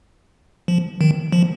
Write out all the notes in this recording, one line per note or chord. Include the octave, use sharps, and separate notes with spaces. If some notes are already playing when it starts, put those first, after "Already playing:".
F3
D#3
F3